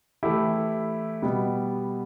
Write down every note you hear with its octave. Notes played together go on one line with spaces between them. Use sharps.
E3 A3 E4 G4
B2 G3 B3